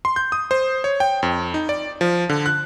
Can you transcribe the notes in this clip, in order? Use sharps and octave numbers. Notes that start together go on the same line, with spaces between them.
C6
G6
D#6
C5
C#5
G5
F2
D#4
D5
F3
D3
F#6